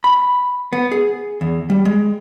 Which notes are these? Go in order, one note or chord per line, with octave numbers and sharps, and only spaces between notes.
B5
B3
G#4
E2
G3
G#3